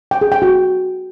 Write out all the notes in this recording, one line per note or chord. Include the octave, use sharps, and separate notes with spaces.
G5
G#4
G5
F#4